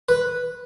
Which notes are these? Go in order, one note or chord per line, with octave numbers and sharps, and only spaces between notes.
B4